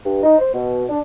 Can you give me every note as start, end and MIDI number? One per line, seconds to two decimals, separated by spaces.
0.05 0.20 43
0.23 0.38 63
0.39 0.49 72
0.54 0.84 47
0.90 0.99 62